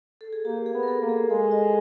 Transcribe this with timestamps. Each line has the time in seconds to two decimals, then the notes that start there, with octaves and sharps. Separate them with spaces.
0.21 A4
0.33 G#4
0.45 A#3 G4
0.66 G#4
0.74 B3
0.83 A#4
0.88 A4
1.02 A#3
1.09 G#4
1.30 G#3 A4
1.51 D#5